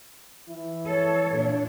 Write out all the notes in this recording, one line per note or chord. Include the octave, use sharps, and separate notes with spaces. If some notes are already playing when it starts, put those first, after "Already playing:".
E3 E4
A4 C#5
A#2 D4